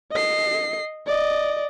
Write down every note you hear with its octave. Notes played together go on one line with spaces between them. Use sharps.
D#5 C7
D5 D#5